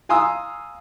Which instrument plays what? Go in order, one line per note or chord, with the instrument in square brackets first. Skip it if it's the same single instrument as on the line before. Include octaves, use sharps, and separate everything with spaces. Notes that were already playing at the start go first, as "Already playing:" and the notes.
[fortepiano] F5 G#5 A#5 C6 D#6 E6